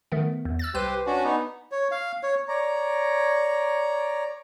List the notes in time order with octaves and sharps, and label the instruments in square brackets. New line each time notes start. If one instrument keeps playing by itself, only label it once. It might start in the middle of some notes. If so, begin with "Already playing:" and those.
[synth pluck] D#3 A3 B3
E2
E6 F#6 A6
[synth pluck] C2 B4 D#7 [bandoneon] G4 C5
[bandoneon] C#4 D4 F#4
B3 D#4
[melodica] C#5
F5
C#5
[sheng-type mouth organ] C#5 D5 A#5